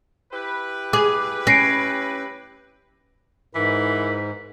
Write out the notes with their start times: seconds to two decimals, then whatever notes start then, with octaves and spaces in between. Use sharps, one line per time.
0.33 E4 G4 B4
0.93 G#4 D6
1.47 C#4 A#6 C7 D7
3.55 G#2 E3 A#4 B5